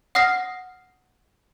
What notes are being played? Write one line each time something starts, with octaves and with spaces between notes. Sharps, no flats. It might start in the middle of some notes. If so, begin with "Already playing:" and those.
F#5 D#6 F6 A#6 C7